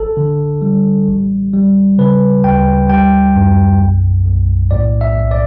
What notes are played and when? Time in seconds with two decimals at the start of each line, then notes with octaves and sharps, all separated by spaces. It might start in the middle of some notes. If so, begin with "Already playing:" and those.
Already playing: A1 A4
0.17 D3
0.62 G3
1.08 A1
1.53 G3
1.98 C#3 B4
2.44 D2 G5
2.89 G3 G5
3.35 F#2
3.80 B1
4.26 B1
4.71 A2 D5
5.01 E5
5.16 B1
5.31 D5